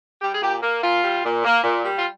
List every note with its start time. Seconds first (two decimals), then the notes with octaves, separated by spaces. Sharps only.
0.21 G3 G4
0.32 G#4
0.42 A#2 G4
0.62 A#3
0.82 A#2 F4
1.03 G3
1.24 A#2
1.44 A#3
1.64 A#2
1.85 G3
1.97 F4